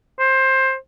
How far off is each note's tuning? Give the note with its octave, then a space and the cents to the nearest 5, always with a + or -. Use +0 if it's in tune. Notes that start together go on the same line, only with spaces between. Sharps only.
C5 +15